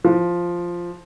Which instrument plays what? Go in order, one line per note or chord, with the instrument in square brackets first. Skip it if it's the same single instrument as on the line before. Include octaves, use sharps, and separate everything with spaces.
[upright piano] F3